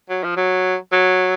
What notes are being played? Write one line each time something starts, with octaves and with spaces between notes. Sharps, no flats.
F#3
F3
F#3
F#3